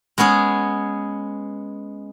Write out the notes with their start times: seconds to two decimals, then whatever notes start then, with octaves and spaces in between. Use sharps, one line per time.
0.18 G#3 B3 C#4 G#4